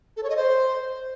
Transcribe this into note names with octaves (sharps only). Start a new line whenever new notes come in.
A4
C#5
D#5
C5